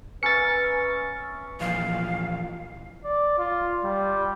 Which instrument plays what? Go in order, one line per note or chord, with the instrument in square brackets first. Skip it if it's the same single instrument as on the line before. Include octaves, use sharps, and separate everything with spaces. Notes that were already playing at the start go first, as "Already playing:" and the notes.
[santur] C#4 A#4 E5 [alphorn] B4 [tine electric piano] A6 C#7
[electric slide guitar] A#2 E3 F3 [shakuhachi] F5
[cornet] D5
F4
G3